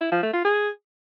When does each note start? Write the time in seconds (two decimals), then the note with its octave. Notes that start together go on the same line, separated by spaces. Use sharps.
0.01 E4
0.12 F3
0.23 A3
0.34 F4
0.45 G#4